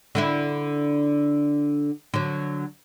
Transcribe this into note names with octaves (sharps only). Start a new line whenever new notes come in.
D3 D4 E4
D3 F#3